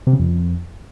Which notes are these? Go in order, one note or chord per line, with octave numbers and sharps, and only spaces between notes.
C3
C#3
F2